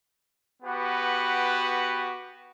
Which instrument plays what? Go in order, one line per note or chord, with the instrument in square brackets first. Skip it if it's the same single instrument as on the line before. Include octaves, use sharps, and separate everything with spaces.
[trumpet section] B3 F#4 G4 B4